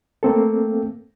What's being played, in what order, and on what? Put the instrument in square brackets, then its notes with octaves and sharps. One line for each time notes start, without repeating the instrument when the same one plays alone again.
[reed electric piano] A3 A#3 C4 A4